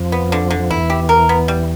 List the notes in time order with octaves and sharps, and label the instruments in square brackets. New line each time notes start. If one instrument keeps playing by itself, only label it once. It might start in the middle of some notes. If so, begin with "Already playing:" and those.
Already playing: [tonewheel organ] F2 F3
[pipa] B3
D3
D3
[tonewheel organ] F3
[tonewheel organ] E2 E3 [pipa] E4
[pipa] G4
A#4
B3
G3